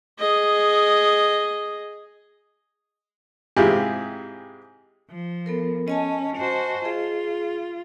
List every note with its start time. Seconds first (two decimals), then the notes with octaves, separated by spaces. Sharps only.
0.19 G#4 D#5
3.56 G#2 C3 E4 F4 G4 G#4
5.10 F3
5.46 B3 A4 A#4
5.88 C#4 D#5 G#5 A5
6.37 F#4 C5
6.85 F4 G#4